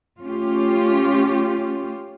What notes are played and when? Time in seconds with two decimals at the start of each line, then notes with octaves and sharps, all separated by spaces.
0.21 A3 C#4 F4 G4